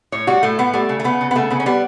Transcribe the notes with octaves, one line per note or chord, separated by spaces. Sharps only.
A2 C#5
G3 F#4
A2 A3
A2 B3
G3 A3
C#3
A3
C#3 B3
C#3
B3
C#3 A3
C#3 B3
C#4
G3 B3